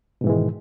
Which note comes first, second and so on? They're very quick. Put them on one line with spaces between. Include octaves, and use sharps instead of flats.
B2 G#2 E3 G#3 D#3